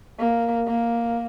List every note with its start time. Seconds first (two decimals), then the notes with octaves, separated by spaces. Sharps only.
0.19 A#3
0.67 A#3